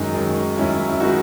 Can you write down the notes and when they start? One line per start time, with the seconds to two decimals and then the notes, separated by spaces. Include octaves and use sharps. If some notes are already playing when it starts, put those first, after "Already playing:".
Already playing: F#2 D#3 G#3 D#4
0.14 F#2 D#3 G#3
0.57 F#2 D#3 G#3 C#4 E4
0.89 E4
1.00 D#3 G#3 D#4 F#4